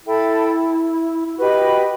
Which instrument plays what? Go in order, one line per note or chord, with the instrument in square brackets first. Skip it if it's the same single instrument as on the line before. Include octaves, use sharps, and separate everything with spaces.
[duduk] E4 [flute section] A4 E5 G5 B5
[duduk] E4
[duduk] F#4 [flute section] G4 B4 D#5 G5
[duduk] E4
F#4